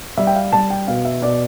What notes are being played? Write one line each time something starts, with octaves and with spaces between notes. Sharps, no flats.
G3 E5
G5
F5
G3 A5
G5
B2 F5
E5
B2 D5